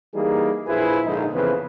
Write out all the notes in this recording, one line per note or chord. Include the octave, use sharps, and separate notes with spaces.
E3 G3 A#3 D#4 G#4
A#1 F3 E4 G#4 B4 C5
A#1 G#2 D3 D#4
F2 C#3 E3 B3 B4 C5